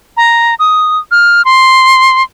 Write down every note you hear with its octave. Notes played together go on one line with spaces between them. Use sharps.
A#5
D#6
F6
C6